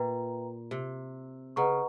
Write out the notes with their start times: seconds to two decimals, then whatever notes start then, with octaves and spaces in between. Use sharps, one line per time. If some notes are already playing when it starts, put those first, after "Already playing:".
Already playing: A#2 B4 E5 G5 A#5
0.71 C3
1.56 C#3 B4 D#5 F#5 A#5 C#6